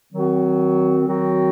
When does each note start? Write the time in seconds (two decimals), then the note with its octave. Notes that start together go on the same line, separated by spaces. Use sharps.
0.11 D#3 F#3 C4 F#4
1.06 D#3 F#3 C4 F#4